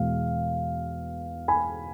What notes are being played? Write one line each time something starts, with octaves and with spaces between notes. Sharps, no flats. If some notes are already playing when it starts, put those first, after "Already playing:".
Already playing: E2 B2 G#3 F5
G#5 B5